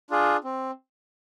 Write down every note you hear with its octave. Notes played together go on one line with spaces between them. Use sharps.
D4 F4 G#4
C4